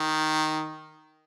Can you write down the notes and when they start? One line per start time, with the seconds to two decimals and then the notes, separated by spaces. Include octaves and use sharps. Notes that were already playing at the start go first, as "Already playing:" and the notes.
Already playing: D#3